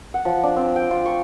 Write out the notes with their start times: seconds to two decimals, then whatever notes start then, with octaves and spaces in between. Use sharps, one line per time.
0.14 F#5
0.25 F3
0.43 D4
0.56 C4
0.76 G5
0.91 F4
1.06 C#6